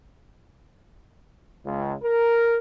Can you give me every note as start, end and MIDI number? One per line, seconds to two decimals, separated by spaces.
1.66 1.93 37
2.03 2.58 70